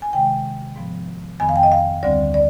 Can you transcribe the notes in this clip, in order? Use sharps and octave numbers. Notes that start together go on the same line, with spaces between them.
G#5
C3 D#3 G#3 G5
G#2 F3 B3
F2 D#3 B3 G#5
F5
G5
D#5
F5
D2 D3 G3 C4 D5
D5